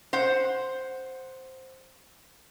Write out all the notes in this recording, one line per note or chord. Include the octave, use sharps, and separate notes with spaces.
C5 F#5